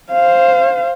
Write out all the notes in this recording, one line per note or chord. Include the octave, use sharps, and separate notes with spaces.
C5 F5